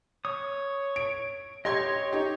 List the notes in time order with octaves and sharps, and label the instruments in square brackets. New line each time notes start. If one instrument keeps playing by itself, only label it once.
[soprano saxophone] C#5 [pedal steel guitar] D#6
[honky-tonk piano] D7
[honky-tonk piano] G4 C6 G#6 [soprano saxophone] C#5 [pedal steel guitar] D#5
[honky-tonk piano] D#4 G4